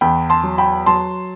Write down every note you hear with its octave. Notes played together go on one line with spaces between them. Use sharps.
E2 G5 B5
A5 C6
F#3
G5 B5
F#3 A5 C6